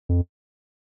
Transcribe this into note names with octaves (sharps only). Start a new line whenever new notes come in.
F2